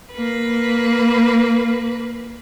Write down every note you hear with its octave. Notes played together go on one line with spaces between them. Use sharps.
A#3 B4